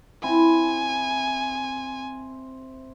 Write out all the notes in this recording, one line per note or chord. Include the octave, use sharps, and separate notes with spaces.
C4 E4 G#5